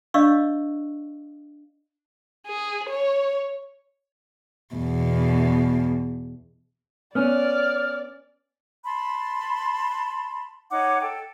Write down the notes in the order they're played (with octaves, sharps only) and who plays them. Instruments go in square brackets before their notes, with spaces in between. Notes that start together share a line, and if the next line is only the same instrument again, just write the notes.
[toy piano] D4 D5 D#5 F5 C#6 E6
[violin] G#4
C#5
[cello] E2 B2
[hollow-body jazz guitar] B3 C#4 [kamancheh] D5 [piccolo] F6
[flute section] A5 B5 C6
D#4 C#5 F#5 D6
A4 G5